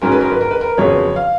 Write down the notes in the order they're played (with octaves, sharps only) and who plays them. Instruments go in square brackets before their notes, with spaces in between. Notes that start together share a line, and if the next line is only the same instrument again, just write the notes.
[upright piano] G#2 F#3 C#4 A#4
B4
A#4
B4
A#4
B4
A#4
F2 C#3 F#3 B3 C#5
F5